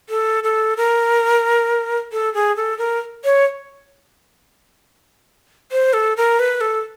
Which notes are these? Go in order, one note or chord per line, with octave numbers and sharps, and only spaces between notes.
A4
A4
A#4
A4
G#4
A4
A#4
C#5
C5
A4
A#4
B4
A4